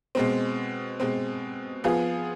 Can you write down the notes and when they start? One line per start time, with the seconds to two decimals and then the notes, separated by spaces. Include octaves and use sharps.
0.15 B2 G#3 C4
1.00 B2 G#3 C4
1.84 F3 B3 F4 G#4